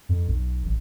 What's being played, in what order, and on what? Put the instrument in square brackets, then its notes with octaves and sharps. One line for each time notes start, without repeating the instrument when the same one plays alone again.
[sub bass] F2
B1
A1